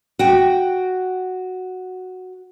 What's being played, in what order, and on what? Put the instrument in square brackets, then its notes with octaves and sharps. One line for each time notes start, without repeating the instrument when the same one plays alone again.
[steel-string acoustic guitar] F#4 G5